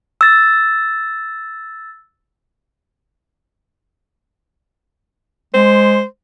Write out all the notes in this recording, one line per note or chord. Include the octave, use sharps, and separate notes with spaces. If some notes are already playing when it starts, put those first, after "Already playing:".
E6 A6
G#3 C5